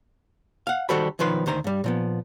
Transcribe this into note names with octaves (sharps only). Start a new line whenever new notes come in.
F5 F#5
D#3 G3 F#4 A4 C5 B5
B1 D#3 F3 B4 C6
D2 D#3 C5 A#5
G2 G3
A#2 F3 B3